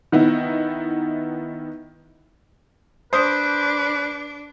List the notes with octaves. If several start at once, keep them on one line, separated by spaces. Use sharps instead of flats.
D#3 B3 D#4 E4
D4 B4 C5 D#6